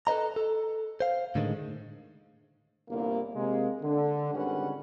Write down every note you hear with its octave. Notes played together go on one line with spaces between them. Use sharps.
A4 B4 C5 D#5 A#5
A4
C5 F5
A2 D3 D#3 G#3
G1 C2 A#3
C3 G#3 A#3
D3
G#1 D3 G3 C#4 B4 F#5